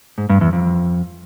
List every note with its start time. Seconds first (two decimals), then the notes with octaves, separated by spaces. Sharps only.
0.18 G#2
0.30 G2
0.41 E2
0.53 F2